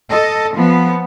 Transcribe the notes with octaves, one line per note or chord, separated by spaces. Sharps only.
A4 D#5
F3 B3